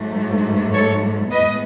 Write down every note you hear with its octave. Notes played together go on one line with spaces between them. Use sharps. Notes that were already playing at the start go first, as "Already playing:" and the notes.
Already playing: G#2 F#3 A3
A4 C#5
A2 G#3 B3 B4 D#5